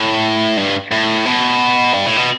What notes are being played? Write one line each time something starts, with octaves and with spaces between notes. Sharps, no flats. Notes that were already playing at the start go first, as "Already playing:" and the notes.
Already playing: A2
G2
A2
B2
G2
A2
B2